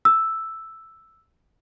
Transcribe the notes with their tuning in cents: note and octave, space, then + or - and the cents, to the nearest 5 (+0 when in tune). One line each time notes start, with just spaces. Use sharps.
E6 +0